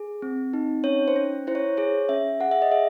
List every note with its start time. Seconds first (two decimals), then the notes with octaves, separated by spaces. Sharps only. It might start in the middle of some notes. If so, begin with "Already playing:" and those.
Already playing: G#4
0.22 C4
0.53 D#4
0.84 C#4 C#5
1.08 C5
1.16 C#4
1.47 E4 C5
1.55 C#5
1.77 G#4 C#5
2.09 C#4 E5
2.40 G#4 F#5
2.51 E5
2.62 D#5
2.71 G#4 E5